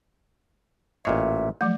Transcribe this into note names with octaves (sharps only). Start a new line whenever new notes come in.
A1 A#2 C#5 D#5 E5
F3 F#3 A3